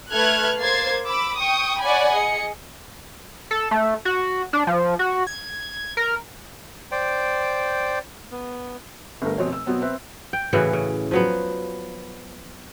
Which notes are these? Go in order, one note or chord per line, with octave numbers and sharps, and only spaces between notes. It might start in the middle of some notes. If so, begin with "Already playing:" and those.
A3 A4 B4 F6 F#6 G#6
A#3 C5 G#6 A6 C7
B5 D6 E6
G5 C#6 D#6
C#5 D5 F#5 G#5 B5
G#4 D#5 C#7
A4
A3
F#4
D4
F3
F#4
G#6
A#4
C5 D5 G5
B3
G1 D3 A3 A#4
F1 B2 C4 C#5
E6
B2 F#3 B3 C4
C4 B4 E5
G5
A2 C#3 E3 F#4
C#3
F3 F#3 B3